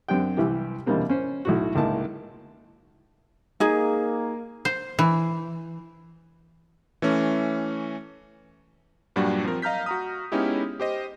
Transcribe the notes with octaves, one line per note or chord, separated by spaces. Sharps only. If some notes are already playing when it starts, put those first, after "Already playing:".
F#2 C4 D4 G4 G5
C2 E3 G4
E2 B2 D3 G3 A#3 C4
C#4 C5
B1 A2 F#4
C#2 A2 A#3 D#4 A5
A#3 D#4 G#4
C5
E3
E3 A3 C#4
G2 A#2 F#3 G3 D4 F#4
F3 C4 A#4
D#5 F5 A#5 F6 G6 B6
F#4 A#5 D#6
G#3 B3 C#4 D#4 E4 G4
G4 C5 D#5